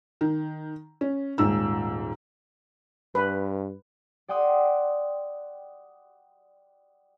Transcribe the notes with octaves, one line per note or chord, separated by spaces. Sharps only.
D#3
C#4
D#1 G#2 E6
G2 B4
D5 F#5 G5 C6 D#6